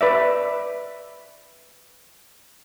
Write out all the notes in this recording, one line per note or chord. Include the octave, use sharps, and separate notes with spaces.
B4 D5 E5